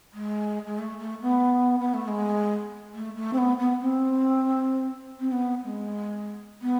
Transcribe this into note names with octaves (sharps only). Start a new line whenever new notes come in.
G#3
G#3
A3
A3
B3
B3
A3
G#3
A3
A3
C4
B3
B3
C4
C4
B3
G#3
B3